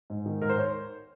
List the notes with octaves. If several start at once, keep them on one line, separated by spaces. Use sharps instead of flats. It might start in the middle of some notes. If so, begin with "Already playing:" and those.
G#2
D#3
G#2 A#4
C5
C#5